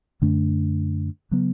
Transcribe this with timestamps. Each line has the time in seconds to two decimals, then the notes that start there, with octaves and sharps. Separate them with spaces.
0.22 F#2 D3 A3 D4
1.31 C#3 F#3 B3